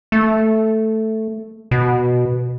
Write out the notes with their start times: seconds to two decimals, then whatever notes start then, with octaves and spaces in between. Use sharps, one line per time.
0.12 A3
1.71 B2